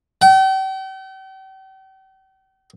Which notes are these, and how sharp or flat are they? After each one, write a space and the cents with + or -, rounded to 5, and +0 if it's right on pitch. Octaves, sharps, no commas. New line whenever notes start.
G5 -40